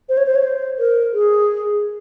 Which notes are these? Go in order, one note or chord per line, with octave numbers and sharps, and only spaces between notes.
C5
C#5
C5
C#5
C5
A#4
G#4